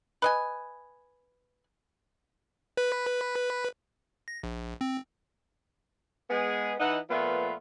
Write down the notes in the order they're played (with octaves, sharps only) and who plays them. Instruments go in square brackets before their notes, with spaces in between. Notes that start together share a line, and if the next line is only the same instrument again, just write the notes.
[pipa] B4 D#5 G#5
[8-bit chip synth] B4
A#6
A#1
C4
[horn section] G#3 B3 G#4
E3 D#4 F#5
A#2 F3 A3 B3 F4 B4